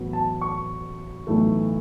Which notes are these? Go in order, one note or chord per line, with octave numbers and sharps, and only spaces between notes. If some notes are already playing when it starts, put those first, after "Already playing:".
Already playing: A1 A2 F#3 B3
A5
C#6
B1 A2 E3 A3